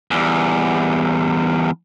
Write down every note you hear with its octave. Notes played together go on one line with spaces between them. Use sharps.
E2 G3